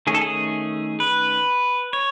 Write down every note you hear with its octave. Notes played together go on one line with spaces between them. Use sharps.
D#3 A3 C#4 G#4
A4
G#4
B4
C#5